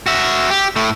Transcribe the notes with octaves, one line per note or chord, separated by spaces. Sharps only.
F#4 E5
G4
A2 A3